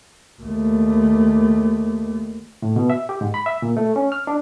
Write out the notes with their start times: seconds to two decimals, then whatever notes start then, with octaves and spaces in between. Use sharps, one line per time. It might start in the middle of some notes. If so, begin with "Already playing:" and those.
0.42 D#2 A3
2.62 A2
2.76 B2
2.90 E5
3.09 G4
3.21 G#2
3.34 B5
3.46 E5
3.62 A#2
3.77 A3
3.96 C#4
4.12 F6
4.27 D4